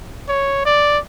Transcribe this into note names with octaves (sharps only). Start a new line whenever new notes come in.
C#5
D5